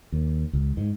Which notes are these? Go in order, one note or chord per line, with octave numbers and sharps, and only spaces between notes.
D#2
C#2
G#2